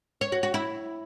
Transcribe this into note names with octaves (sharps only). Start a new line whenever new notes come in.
C#5
F#4
F#4
E4